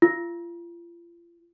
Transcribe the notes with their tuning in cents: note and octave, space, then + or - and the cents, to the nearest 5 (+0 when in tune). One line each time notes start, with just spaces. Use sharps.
F4 -35